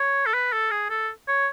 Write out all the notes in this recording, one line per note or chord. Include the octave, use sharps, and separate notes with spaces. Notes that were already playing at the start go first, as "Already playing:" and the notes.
Already playing: C#5
A4
B4
A4
G#4
A4
C#5